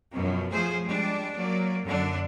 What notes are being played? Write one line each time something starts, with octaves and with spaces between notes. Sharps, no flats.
F#2 B2 F3
F3 A3 G#4 C5
G3 G#3 D4
F#3 A#3 D5
F#2 D3 D4